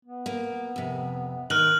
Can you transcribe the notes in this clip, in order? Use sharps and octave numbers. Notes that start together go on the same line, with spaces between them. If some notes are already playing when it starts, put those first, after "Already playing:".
B3
A#3
F2 C3
D#3 F6 F#6 F#7